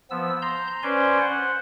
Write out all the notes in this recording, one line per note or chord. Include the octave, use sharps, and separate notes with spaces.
F3 B3 E6
A#5 C6 G6
C#4 B4 C5 D5 G#5 C6
C5 F#5